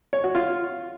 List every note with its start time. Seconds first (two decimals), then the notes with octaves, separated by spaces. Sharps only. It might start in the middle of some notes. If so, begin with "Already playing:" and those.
0.13 C#5
0.24 F#4
0.35 F4